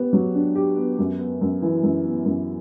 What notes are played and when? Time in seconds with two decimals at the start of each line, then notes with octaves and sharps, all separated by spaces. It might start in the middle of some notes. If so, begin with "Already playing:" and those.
Already playing: B3 G4
0.13 F#3
0.35 D4
0.55 G4
0.77 B3
0.99 F#2
1.19 B3
1.41 F#2
1.62 E3
1.83 F#2
2.04 B3
2.25 F#2